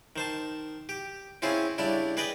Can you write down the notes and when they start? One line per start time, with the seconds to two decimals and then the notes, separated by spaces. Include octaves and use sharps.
0.16 D#3 C5 A5
0.89 G4
1.42 C4 C#4 E4 F4 G#4
1.78 C#3 G3 D4 E4
2.17 G#4 B4 D5 D#5 G5